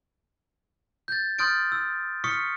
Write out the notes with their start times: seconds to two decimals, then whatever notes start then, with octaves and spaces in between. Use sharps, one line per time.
1.08 G6 A6
1.39 C6 D#6 F6 G6 A6 D7
1.72 E6
2.24 C#6 D#6 F6 B6 C#7